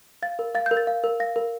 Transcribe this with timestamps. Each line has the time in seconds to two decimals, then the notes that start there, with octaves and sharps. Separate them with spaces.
0.23 F5 A6
0.39 A#4
0.55 F5 A6
0.66 G6
0.71 A#4
0.77 A6
0.87 F5
1.04 A#4
1.20 F5 A#6
1.36 A#4